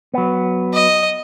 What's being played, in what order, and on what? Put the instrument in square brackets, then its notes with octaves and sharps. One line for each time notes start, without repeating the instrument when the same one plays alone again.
[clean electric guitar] F#3 B3
[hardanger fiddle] D#5